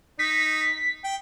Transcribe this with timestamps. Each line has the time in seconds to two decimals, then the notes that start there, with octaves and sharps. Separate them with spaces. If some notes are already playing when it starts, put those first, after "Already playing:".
0.19 D#4 B6
1.04 G5